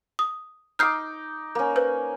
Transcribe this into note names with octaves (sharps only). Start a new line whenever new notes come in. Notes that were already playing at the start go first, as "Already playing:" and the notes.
D#6
D#4 D6 F6 G6 C7
A#3 C#4
B4 C5 G6